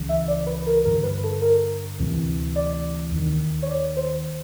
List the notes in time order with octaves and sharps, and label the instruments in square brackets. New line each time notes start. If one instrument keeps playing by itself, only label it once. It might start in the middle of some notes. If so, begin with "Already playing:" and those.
Already playing: [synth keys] C#2 C#3 E3
E5
D5
B4
A#4
G2 D3 A#4
B4
A4
A#4
D2 C3 E3
D5
D#2 D#3
C#5
D5
C5